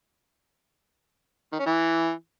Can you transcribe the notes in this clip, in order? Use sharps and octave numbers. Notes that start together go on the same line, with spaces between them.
D#3
C#4
E3